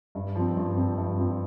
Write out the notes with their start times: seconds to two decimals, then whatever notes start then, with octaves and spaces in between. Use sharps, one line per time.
0.15 G2
0.35 F3 C4
0.57 G2
0.77 F3 C4
0.98 G2
1.18 F3 C4